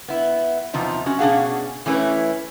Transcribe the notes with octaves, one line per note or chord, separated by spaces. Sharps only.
B3 E4
E2 C3 F3 D#4
C#4 F#4
B2 C#4 D4 G#4 F5 F#5
E3 A3 C#4 E4 B4